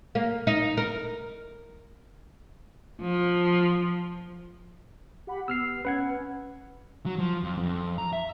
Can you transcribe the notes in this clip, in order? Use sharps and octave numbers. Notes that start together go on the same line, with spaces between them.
A#3
D#4
A#4
F3
G4 F#5 B5
B3 E6 F6 C7
C#4 B4 F#5 G#6
F#3
F3
F2
F2
A#5
E5